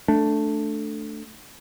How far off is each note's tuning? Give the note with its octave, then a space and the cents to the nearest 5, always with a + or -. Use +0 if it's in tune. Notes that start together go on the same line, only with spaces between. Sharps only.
A3 +0 D4 +0